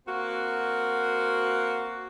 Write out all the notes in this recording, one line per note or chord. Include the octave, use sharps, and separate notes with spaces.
A#3 C4 F#4